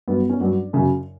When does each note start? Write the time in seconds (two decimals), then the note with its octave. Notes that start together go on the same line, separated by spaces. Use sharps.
0.08 G2 F#3 B3
0.19 B3
0.30 C#4
0.40 G2 F#3 D4
0.73 F#2 C#3 F#3